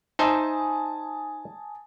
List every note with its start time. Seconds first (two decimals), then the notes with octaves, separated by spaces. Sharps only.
0.19 D#4 C5 E5 G#5 A5 D#6